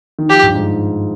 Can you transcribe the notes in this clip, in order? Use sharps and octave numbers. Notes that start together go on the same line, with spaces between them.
D#3
F3 G4
G2
G#2